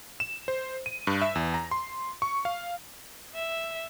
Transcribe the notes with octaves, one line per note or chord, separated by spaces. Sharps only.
E7
C5
D#7
G2
E5
E2
A#5
C6
C#6
F5
E5